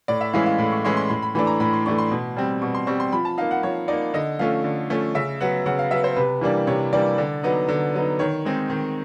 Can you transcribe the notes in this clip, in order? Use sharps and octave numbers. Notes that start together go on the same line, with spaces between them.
A2 D5
E5
E3 G#3 C#4 E4 F5
F5
A2
C#6
E3 G#3 C#4 E4 C6
C6
A2 C6
B5
E3 A3 D4 B5
A#5
A2 B5
C6
E3 A3 D4 C#6
C6
B2
G3 C4
B2 C#6
C6
G3 C4 C#6
C6
F3 B5
A5
A#3 D#4 F5
F#5
F3 C#5
A#3 D#4 D5
D3 D#5
F3 A3 C#4 F5
D3
F3 A3 C#4
C#3 E5
F#3 B3 F#5
C#3 F#5
F5
F#3 B3 E5
C5
C3 B4
E3 G3 A#3 D4
C3 C#5
E3 G3 A#3 D4 D5
D3
F#3 B3 D#4
D3
F#3 B3 D#4
D#3 C#5
G#3 C4 D#4
D#3